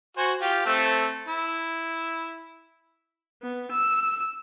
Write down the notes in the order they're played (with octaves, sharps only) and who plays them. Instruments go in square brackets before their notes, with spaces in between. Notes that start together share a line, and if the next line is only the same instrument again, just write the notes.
[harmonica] F#4 C5 G#5
F4 G4
A3 C4 A4
E4
[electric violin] B3
E6